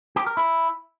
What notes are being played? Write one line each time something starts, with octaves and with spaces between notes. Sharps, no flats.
G4
A#4
E4